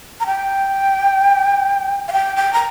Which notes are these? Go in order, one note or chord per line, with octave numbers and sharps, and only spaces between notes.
A#5
G5
F5
G5
G5
A#5